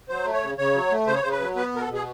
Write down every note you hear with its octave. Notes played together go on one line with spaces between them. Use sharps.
F#3 C5
A3
C#5
C#3
C#3 C#5
F#3
A3
C#3 C5
C#5
C#3 C5
B4
F#3
B3 B4
B2 A#4
A4
B2
G#4